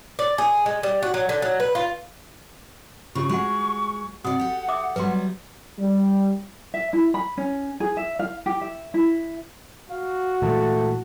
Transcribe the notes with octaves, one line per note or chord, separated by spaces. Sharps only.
D5
G#4
G#3
G3
F#4
F#3
D3
F#3
B4
F4
C#3 F4 G4 C#6
G#3 F#4 F#5
C3 F#4 D5 F#5 D#6
G4 A4
E5 D6 D#6
F#3 G3 B3 B4 C6
G3
E5
E4
B5
C#4
G#4
E5
F5
G4
E5
E4
F#4 F5
A#2 E3 G#3 A3 A5